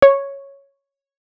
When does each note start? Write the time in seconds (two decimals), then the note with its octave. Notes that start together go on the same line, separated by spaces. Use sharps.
0.02 C#5